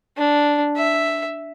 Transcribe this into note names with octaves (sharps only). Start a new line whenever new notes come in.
D4
E5